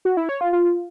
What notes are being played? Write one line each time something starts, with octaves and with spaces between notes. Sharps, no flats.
F#4
E4
C#5
F4
F4